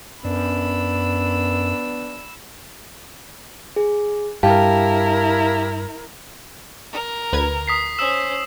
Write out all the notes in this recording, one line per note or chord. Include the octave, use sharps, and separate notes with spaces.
F#2 B3 D4 B5 E6
G#4
G2 E4 G4 A#4 F5 A5
A#4
D2 B4 G#6
D#6 B6 C7
C#4 C5 E6 E7